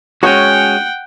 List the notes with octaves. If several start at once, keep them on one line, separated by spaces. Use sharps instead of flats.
G#3 C#4 F#4 C#5 F#5 G5